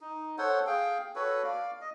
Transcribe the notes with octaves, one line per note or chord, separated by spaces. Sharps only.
D#4
A4 C5 C#5 F#5
G#4 F5 G5
F#4 A4 B4 C#5
D5 F5
D#5